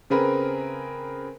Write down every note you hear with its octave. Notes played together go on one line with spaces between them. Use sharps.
C#3 C4 G#4 A#4 B4